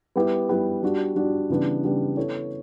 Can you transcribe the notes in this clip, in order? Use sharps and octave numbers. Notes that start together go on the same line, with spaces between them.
G3 B3 E4 G4 B4
G3 B3 E4 G4 B4
G3 D4 F#4
G3 D4 F#4
C#3 E3 G3 B3 D4
C#3 E3 G3 B3 D4
B3 E4 A4 C#5